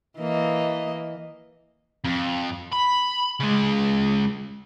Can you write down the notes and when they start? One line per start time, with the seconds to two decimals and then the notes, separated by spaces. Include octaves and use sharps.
0.19 E3 A#3 D#5
2.05 F2
2.73 B5
3.40 C#3 G#3